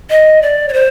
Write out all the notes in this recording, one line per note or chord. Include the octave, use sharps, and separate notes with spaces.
D#5
D5
C#5
C5